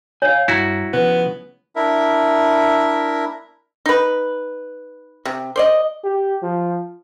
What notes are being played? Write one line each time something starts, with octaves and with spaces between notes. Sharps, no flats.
C#5 F5 G#5
G2 E4 F#4 A#5
C#3 F3 B3
D4 E4 A#4 E5
D#4 B4
C3
C5 D5 D#5
G4
F3